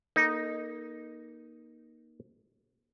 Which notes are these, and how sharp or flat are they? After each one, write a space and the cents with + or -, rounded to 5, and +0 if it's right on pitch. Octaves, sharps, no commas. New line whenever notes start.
A#3 +25 D#4 +0 A4 +0